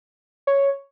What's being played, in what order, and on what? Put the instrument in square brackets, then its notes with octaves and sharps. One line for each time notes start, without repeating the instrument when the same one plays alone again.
[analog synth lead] C#5